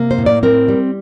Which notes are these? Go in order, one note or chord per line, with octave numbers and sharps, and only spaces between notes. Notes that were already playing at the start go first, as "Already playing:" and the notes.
Already playing: C3 A#3
C5
A2
D5
C4 A#4
G3